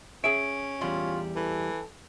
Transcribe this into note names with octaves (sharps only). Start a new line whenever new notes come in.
C#4 G#4 E5 D7
E2 G3 F4 C6
E3 A4